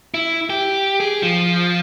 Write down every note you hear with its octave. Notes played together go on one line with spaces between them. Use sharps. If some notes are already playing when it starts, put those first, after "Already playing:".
E4
G4
G#4
F3